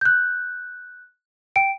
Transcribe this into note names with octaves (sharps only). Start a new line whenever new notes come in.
F#6 G6
G5 D7